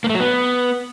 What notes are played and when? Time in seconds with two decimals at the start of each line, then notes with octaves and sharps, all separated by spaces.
0.04 A#3
0.09 A3
0.15 F#3
0.20 B3